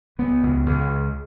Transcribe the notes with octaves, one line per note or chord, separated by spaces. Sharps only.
C#2 B3
C#2
C#2